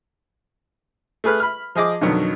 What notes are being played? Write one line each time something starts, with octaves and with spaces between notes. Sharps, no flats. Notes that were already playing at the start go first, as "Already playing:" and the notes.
A3 G#4 B4 F6 F#6
B5 F6
F3 G#4 D#5 D6
F2 B2 D3 D#3 F#3 B3